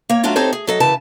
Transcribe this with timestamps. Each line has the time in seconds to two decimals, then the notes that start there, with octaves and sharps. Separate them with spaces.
0.10 A#3 C#5
0.23 F#3 A3 C#4 D4 F4 F#4
0.36 C4 D#4 G4 A4 C5 C#5
0.53 G#4
0.67 F#3 A4 D#5
0.80 F#2 C#3 E3 B4 A5